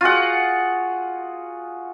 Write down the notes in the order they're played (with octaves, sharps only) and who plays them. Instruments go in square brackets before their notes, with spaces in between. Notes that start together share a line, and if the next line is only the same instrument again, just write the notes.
[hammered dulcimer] F4 F#4 G#4 F#5